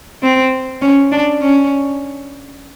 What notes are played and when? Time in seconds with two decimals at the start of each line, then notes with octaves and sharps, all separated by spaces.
0.23 C4
0.82 C#4
1.11 D4
1.41 C#4